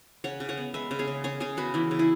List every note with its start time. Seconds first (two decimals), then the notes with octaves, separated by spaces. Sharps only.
0.24 C#3 C#5 F#5
0.40 C#3
0.49 C#5 F#5
0.58 B3
0.74 G#3 B4 E5
0.91 C#3
0.99 G#4 C#5
1.07 C#3
1.24 C#3 G#4 C#5
1.40 C#3 G#4 C#5
1.57 B3 F#4 B4
1.74 E3 E4
1.91 C#3
1.99 E4 G#4